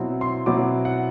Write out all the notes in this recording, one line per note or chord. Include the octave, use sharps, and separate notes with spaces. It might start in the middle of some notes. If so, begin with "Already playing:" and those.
Already playing: B2 F#3 C4 E4
C6
B2 F#3 C4 E4 D6
F#5